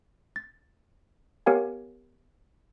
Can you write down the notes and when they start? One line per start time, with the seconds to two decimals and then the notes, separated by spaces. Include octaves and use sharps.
0.36 A6
1.46 B3 G4 A#4 C#5 F5 G#5